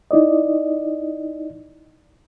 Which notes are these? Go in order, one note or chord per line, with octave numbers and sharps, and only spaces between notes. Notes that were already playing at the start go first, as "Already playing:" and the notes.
D#4 E4 D5 D#5